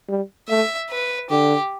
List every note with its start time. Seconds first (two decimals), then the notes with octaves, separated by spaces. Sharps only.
0.09 G3
0.49 A3 E5
0.90 B4
1.30 D3 G4